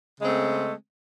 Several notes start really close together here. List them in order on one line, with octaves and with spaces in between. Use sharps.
C#3 G#3 C4 A3